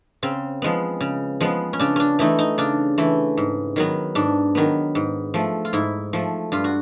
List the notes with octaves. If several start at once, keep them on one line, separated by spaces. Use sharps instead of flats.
C#3 C4
F3 G#3 B3
C#3
F3 G#3 B3
C#4
C#3 D4
C#4 D4
E3 A3 D#4
D#4
C#3 D4
E3 A3
G#2
D#3 F#3 B3
G#2 D4
D#3 F#3 B3
G#2
F3 A3
F4
G#2 E4
F3 A3
G2 F4
F#4